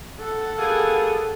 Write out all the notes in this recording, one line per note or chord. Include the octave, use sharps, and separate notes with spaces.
A4 F#5
G3 A#3 G#4